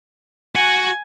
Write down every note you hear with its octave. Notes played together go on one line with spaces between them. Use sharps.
F#4 F#5 G#5